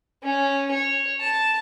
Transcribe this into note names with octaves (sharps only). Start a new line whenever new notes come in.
C#4
C#5
A5